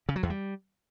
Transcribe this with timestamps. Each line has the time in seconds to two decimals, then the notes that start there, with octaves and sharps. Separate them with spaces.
0.09 C#3
0.16 F#3
0.23 E2
0.30 G3